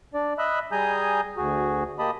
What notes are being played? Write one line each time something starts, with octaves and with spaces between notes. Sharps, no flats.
D4 D5
D#5 E5 B5 E6 F#6
G3 G#4 G#5 A#5 D#6 G6
D2 F#4 G#4
A#3 G4 D#5 A5 B5 D#6